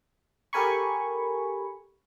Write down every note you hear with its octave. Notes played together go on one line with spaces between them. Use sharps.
G4 A4 A#4 G#5 B5 C#6